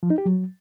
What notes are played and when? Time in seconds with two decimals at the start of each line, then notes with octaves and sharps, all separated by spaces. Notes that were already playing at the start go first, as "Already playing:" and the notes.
0.03 F3
0.10 D#4
0.18 G4
0.26 F#3